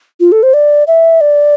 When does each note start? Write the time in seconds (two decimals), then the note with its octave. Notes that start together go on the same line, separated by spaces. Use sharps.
0.20 F4
0.32 A4
0.43 C5
0.54 D5
0.87 E5
1.21 D5